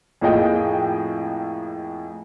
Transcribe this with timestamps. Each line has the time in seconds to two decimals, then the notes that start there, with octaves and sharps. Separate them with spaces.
0.21 F2 A2 A#3 G#4 D#5 G5